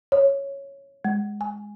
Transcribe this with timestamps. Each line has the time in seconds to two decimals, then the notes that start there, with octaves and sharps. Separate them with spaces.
0.12 C#5
1.05 G#3
1.41 G#5